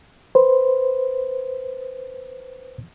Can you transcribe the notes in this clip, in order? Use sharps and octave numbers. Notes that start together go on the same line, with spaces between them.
B4 C5